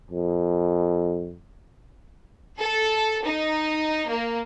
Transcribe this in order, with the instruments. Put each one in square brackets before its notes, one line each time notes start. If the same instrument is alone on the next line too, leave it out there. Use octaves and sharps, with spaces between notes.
[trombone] F2
[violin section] A4
D#4
A#3